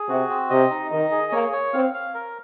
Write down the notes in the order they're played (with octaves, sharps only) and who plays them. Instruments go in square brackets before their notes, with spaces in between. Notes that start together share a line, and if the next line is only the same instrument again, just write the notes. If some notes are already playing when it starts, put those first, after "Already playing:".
Already playing: [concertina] G#4
[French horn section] C3 [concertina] F#4
[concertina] C4
[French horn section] C3 [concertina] D#5
[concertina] D#4
[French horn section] D#3 [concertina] D#5
[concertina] G#4
[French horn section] A#3 [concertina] C#5
[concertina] C#5
[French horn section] C4 [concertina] F5
[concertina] F5
A#4